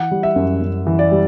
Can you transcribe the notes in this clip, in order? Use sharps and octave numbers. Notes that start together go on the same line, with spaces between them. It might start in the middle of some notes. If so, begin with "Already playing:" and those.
Already playing: E3 F#5
G3
E5
F#2
F#2
E3
D5
G3